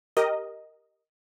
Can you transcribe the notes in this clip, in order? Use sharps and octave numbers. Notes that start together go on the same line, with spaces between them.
G4 A#4 D#5